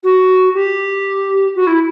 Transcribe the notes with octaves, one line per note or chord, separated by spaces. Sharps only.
F#4
G4
F#4
E4